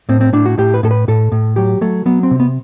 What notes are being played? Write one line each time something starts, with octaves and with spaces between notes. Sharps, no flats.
A2 C4
C4
A2 D4
F#4
A2 G4
B4
A2 A4
B4
A2 A4
A2
F#3 G4
F#3 A3
F#3 B3
C4
C3
B3